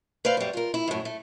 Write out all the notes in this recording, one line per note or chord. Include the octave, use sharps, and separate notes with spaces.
B4 C5 D5 F5
F#2 G3
F4 A#4
E4
F#2 A2
A3